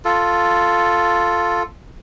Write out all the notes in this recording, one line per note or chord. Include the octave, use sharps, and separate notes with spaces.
F4 A4